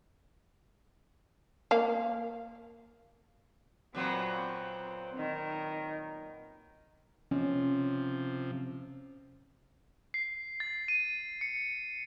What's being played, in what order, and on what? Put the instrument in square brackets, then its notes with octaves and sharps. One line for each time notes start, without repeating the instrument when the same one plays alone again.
[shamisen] A#3 F5
[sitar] A#2 F#3 B3 [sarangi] C4
[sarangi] D#3
[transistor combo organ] C3 F3 [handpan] C#4
[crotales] C7
A6
D#7
C#7